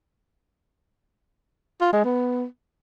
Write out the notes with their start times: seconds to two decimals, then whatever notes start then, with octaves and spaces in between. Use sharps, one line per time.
1.81 F4
1.93 G#3
2.05 B3